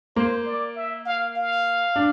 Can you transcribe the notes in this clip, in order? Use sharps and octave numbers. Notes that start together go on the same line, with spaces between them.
A#3 C5
D5
E5
F5
F5
D4